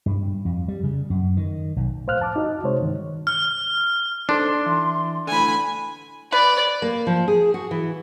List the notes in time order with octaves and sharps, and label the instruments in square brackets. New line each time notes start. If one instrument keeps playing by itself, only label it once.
[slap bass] G2
F2
G3
C#3
F#2
D#3
B1
[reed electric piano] C#2 A2 C5 F5 F6 F#6
F2 A5 D6
D#4 F#4 D#5
C3 G#3 C5 C#5
G2 D#3
[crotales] F6
[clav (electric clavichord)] D4 [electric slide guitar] D#4 A4 C5 [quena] C6
[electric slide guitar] E3
[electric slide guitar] A2 D3 [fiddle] G#5 B5
[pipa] B4 [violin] D5
[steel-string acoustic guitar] A#3
F3
G#4
F#4
E3